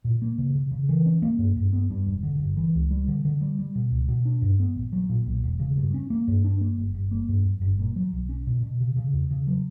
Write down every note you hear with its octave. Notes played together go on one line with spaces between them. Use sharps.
A#2
A#3
C#3
C#3
C#3
E3
C#4
A#3
G2
G2
B3
G2
E1
D3
G1
E3
C#2
G3
D3
D3
G3
G3
B2
C#2
B2
D4
G2
B3
A#1
F#3
A#2
B1
E1
C#3
G2
C#4
A#3
G2
D4
A#3
G1
G1
A#3
G2
F#2
G1
A#2
F#3
B1
C#4
B2
B2
C#3
C#3
E2
C#3
F#3